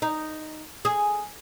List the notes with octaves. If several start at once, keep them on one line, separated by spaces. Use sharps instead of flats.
D#4
G#4